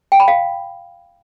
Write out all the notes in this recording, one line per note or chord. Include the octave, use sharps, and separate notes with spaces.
G5
B5
F5